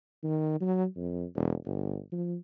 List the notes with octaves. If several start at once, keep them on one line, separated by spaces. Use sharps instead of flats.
D#3
F#3
F2
E1
G1
F3